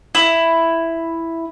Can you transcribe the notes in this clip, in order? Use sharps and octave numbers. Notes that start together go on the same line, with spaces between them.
E4